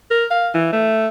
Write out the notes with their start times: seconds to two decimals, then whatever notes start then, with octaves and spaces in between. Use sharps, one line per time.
0.11 A#4
0.31 F5
0.54 E3
0.73 A3